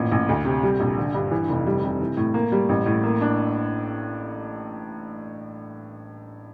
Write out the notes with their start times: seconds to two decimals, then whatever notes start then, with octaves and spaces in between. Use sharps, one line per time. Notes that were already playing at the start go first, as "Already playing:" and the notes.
Already playing: A1 A#2
0.11 A1
0.29 D2
0.45 C3
0.63 G3
0.80 A#1
0.97 D3
1.14 G2
1.31 E3
1.49 F1
1.66 G3
1.84 C3
2.00 E3
2.17 A2
2.34 A#3
2.52 G3
2.69 A1
2.86 A2
3.04 A#3
3.21 D4